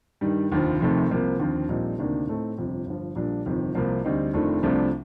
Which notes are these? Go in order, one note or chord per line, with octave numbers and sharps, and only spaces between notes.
G2 D#3 G3
F1 D#2 D3 F3
F1 F2 C3 D#3 A3
C2 C3 F3 A#3
D#2 D3 F3 C4
A#1 A#2 G3 C4 D#4
D2 C3 D#3 A#3 D4
A2 A3 C4 D#4
G1 F2 C3
G1 G2 F3
A#1 A#2 G3 D4
G1 F2 C3 D#3
C2 C3 F3 A#3
D2 D3 G3 C4 D#4
F1 F2 D#3 A3 D4
C2 C3 F3 A3 D4